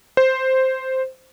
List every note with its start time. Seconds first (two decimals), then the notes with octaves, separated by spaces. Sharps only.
0.17 C5